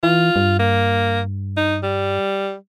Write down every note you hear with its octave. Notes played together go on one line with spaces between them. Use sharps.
E3 F4
G2
A#3
D#4
G3